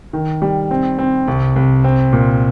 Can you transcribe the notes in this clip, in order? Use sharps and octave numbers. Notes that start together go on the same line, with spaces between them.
D#3
G3
C4
C4
C2
C2
C4
A#2